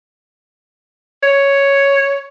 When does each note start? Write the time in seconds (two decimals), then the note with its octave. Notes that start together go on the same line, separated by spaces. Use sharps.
1.23 C#5